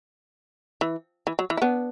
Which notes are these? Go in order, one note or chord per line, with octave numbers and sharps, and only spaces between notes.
E3
E3
F#3
E3
E4
B3 D4